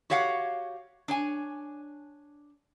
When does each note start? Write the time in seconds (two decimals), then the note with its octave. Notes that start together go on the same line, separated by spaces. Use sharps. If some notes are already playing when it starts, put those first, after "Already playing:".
0.10 F#4 G4 C#5 F5 F#5
1.08 D4 C#5 G#5